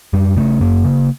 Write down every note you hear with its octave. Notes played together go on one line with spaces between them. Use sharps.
F#2 G3
C#3 A3
F#2 A#3
C#3